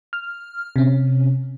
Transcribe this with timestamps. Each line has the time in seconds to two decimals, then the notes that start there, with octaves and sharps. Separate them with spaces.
0.13 F6
0.76 C3 C#4